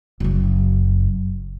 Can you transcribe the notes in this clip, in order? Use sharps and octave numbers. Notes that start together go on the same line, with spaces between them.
F#1 F#2